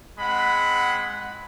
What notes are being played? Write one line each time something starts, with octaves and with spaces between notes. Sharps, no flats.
G#3 C4 F#5 B5